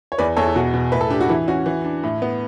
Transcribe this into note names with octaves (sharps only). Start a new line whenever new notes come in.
C#5
E2 B4 D5
E2 A4 C#5
E4
B2 F#4
B2
A2 B4
A4
D4 G4
F#4
E3 E4
C#4 F#4
E3
D4
A2
B3